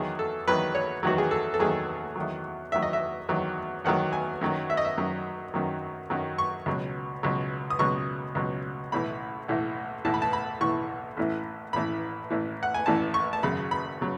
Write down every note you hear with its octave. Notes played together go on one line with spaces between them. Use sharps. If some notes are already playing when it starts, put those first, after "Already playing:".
Already playing: E2 D#3 F#3 G#4
A4
E2 D#3 F#3 B4
C#5
E2 D#3 F#3 F#4
G#4
A4
A4
E2 D#3 F#3 G#4
E2 D#3 F#3
E2 D#3 F#3 E5
D#5
E5
E2 D#3 F#3
E2 D#3 F#3 F#5
G#5
F#2 D#3 F#3
E5
D#5
E5
F#2 D#3 F#3
F#2 D#3 F#3
F#2 D#3 F#3
C#6
C#2 B2 F#3
C#2 B2 F#3
D#6
C#2 B2 F#3 C#6
C#2 B2 F#3
B1 A2 E3 B5
B1 A2 E3
B1 A2 E3 A5
B5
A5
B5
B1 A2 E3 C#6
A1 A2 E3
A1 A2 E3 B5
A1 A2 E3
F#5
G#5
A1 A2 E3 A5
C#6
A5
G#1 F#2 C#3 F#3 B5
B5
C#3 F#3